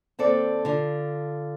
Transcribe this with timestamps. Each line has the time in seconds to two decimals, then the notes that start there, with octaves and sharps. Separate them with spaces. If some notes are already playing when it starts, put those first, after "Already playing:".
0.19 D#2 C4 A4 D5
0.65 D3 F4